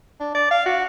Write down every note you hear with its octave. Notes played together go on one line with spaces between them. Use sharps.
D4
D5
F5
F#4